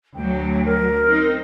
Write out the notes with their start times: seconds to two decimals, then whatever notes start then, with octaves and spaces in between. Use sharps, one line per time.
0.16 D2 F#3 G5
0.65 A#4
1.07 C4 D#4